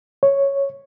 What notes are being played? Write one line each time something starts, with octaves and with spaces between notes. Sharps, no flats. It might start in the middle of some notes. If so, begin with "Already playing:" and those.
C#5